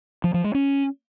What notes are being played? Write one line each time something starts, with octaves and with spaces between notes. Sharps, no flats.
F3
F3
G#3
C#4